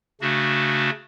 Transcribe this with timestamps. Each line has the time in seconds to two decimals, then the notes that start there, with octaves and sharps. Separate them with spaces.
0.21 C#3 A3 D4 F#4